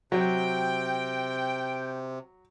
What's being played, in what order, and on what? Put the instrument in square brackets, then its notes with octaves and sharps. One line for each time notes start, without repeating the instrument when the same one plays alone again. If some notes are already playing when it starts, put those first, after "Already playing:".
[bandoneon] C3 [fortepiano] F#3 [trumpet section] G5